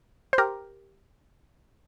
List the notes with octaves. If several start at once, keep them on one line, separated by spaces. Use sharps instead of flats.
C5
G4 A#4